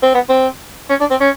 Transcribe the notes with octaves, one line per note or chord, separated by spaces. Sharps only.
C4
B3
C4
C#4
D4
C4
C#4